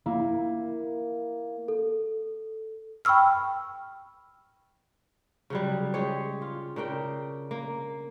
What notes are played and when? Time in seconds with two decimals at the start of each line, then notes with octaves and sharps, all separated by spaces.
0.06 A#3 E4
1.68 A4
3.05 G5 B5 C#6 E6 F6
5.50 C#3 F#3 G3
5.94 G#3 G4 G#4 C#5
6.42 F4
6.76 C#3 D4 A#4 G5
7.51 A#3